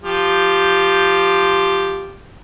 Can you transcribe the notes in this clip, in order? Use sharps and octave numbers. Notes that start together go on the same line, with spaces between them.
F3 G4